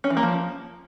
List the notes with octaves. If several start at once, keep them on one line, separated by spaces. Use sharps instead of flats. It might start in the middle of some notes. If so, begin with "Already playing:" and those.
C#4
E3
A#3
F3